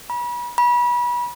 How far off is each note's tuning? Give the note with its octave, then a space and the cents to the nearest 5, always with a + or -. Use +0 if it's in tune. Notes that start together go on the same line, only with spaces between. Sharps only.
B5 -35
B5 -30